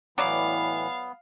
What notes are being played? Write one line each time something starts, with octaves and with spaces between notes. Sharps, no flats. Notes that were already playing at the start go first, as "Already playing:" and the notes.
A2 E3 F#3 B3 D5 F5